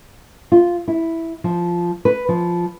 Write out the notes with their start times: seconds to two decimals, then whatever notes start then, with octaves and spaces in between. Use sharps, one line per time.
0.52 F4
0.88 E4
1.44 F3
2.05 B4
2.29 F3